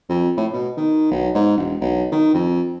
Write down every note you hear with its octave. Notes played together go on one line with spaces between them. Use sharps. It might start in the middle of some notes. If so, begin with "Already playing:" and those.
F2
A2
B2
D#3
B1
G#2
E1
B1
D#3
F2